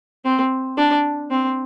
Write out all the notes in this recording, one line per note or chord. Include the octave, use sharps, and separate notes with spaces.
C4
D4
C4